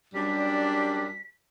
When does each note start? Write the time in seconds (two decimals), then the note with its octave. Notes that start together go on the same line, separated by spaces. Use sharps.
0.15 F#2 G3 D4 B6